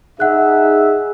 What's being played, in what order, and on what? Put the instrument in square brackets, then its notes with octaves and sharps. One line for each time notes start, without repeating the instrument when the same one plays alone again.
[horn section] D#4 E5 [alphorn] G#4 [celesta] F#5 F#6